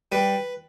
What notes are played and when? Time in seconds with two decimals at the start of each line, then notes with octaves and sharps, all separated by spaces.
0.12 G3 B4